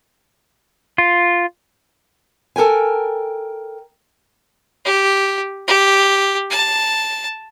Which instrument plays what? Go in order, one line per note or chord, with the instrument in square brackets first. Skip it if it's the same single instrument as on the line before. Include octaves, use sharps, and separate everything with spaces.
[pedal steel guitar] F4
[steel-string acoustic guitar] A4 A#4 G5 G#5
[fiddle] G4
G4
A5